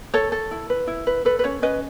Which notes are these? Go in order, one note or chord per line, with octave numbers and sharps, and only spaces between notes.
A4 C#5
A4
E4
B4
E4
B4
A4 B4
B4
C#4 C#5
C#4 B4 D#5